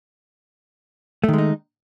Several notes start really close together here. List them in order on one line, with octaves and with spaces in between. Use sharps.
A3 D#3 G#3 D#4